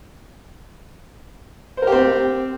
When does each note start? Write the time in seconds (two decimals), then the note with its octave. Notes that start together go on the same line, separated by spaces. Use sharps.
1.77 C5
1.82 A#4
1.87 G4
1.92 C4